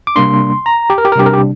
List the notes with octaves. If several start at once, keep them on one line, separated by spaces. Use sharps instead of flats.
D6
C3 G3 A#3 D4 C6
A#5
G4
A#4
G4
A#4
C3 G3 D4 G4
A#4
G4